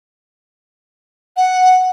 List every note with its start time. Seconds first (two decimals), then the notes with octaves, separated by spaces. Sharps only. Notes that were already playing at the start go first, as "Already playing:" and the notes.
1.37 F#5